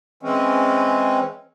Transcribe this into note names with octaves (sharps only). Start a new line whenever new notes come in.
E3 G#3 C4 C#4